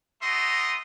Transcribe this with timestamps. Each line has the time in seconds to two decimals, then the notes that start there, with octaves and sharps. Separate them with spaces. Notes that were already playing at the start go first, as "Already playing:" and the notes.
0.22 A3 F#4 D#5 A#5 C6 D#6